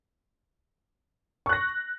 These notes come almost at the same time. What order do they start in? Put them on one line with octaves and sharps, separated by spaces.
C#6 F#6 A#6